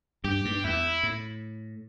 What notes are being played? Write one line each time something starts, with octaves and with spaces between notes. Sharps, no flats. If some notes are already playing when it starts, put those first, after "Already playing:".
G2 G4
G2
E2 E4
A2